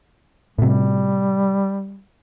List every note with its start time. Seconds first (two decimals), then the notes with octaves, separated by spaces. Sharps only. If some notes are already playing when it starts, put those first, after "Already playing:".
0.58 A2 C3 G3